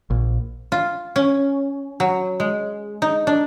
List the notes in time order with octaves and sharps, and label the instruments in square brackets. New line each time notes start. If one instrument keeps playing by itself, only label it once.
[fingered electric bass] A#1
[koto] F4
C#4
F#3
G#3
D#4
D4